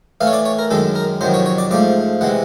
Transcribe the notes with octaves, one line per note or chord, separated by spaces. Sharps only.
A2 E3 A3 F5
C#5
D5
C#5
A#4
F#2 D#3 G#3 A4
A#4
F2 C3 D#3 F#3 C5
C#5
C#5
D5
G#2 F3 A3 D5
C3 E3 G#3 F#5